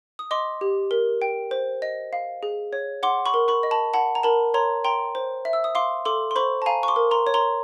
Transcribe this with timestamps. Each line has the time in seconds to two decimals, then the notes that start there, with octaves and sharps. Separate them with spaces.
0.19 D#6
0.31 D#5 C6 D6
0.61 G4
0.91 A#4
1.22 G5
1.51 C5
1.82 D#5
2.13 F5
2.43 G#4
2.73 C#5
3.03 F#5 C6 D6
3.26 B5 C#6
3.34 A#4
3.48 B5 C#6
3.63 D#5
3.71 A5 B5
3.94 F#5 A5 B5
4.15 A#5
4.23 A#4 A5 B5
4.54 C#5 A#5 C6
4.84 G5 A#5 C6
5.15 C5
5.45 E5
5.53 E6
5.64 D#6
5.75 F5 C6 D6
6.05 A4 C6 D6
6.31 C6
6.36 C5 B5 C#6
6.62 A5
6.66 F5 G#5 A#5
6.83 C#6
6.88 C6 D6
6.96 A#4
7.11 A#5 C6
7.27 C#5
7.34 A#5 C6